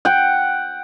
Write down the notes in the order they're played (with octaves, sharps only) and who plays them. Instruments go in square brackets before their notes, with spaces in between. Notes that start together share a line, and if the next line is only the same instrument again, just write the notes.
[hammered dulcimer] F#5 G5